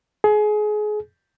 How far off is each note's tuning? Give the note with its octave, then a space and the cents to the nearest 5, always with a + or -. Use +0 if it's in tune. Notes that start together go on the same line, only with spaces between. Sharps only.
G#4 +25